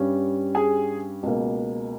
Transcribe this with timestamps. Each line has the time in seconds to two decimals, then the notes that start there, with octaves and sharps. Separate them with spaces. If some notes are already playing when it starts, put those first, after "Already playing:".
Already playing: G2 G3 C#4
0.55 G#4 G#5
1.23 C#2 B2 A#3